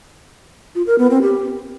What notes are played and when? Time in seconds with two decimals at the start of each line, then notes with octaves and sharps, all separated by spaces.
0.75 F4
0.87 A#4
0.98 B3
1.10 C4
1.22 G4